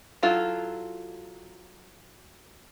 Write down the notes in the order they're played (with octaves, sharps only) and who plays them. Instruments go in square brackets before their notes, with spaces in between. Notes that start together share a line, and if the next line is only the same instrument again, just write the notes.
[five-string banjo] F#3 E4 F4 A4